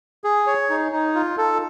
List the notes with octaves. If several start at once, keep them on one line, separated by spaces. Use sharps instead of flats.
G#4
C#5
D#4
D#4
F4
A4